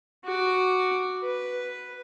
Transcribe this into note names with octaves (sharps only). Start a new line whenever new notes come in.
F#4 D6
B4